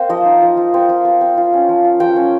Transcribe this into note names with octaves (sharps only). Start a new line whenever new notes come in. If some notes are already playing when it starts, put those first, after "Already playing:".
Already playing: A#3 C4 C5
F3 D#5
D#4
F3
F4
C4
F4
C4
C4
F4
C#4
F3
F4
F3 G5
C#4